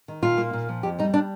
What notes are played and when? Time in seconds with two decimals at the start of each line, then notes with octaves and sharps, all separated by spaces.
0.08 D#3
0.22 A#2 F4
0.38 A#3
0.53 A#2
0.69 F3
0.83 F2 G4
0.99 G3 D#4
1.14 D4